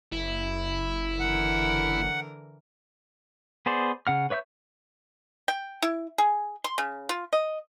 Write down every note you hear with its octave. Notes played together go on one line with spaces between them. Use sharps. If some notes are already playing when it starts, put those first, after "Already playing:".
F#1 E4
D3 E3 A#4 F#5
B3 G#4 C5 D5
C#3 F#5 F6
B4 C#5 E5 C#6 G6
G5
E4
G#4
C6
C#3
F4
D#5